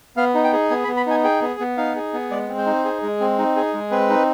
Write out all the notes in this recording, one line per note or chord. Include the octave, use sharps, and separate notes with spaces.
B3 F5
D#4
G5
G#4
B3 G#5
B5
B3
B5
D#4 G#5
G#4 G5
B3
B3
D#4 F5
G#4
B3
G#3 D5
C4
C5
D#4
G#4
G#3
C4
D#4
G#4
G#3
C4 B4
D#4